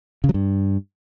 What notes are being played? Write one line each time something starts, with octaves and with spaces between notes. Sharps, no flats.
C#3
F#3
G2